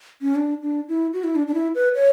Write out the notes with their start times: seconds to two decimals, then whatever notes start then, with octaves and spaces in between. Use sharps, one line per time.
0.22 C#4
0.36 D4
0.62 D4
0.89 E4
1.13 F#4
1.24 E4
1.36 D4
1.47 D4
1.54 E4
1.75 B4
1.95 C#5